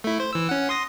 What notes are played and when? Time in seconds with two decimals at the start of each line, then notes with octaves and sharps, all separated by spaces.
0.04 A3 E4
0.20 C5
0.33 E3 E6
0.49 C#4 F#5
0.69 C6 D#6 A#6